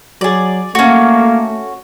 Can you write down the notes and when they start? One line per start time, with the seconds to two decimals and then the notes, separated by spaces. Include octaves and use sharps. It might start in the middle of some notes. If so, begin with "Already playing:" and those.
0.21 F#3 G#4 D5
0.75 A3 A#3 C#4 F#4